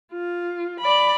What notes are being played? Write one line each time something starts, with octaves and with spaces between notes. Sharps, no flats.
F4
D5 B5